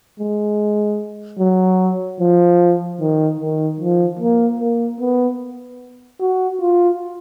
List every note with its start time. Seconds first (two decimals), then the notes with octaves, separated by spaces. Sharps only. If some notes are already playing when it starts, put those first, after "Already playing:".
0.20 G#3
1.40 F#3
2.20 F3
3.01 D#3
3.41 D#3
3.81 F3
4.20 A#3
4.60 A#3
5.00 B3
6.21 F#4
6.61 F4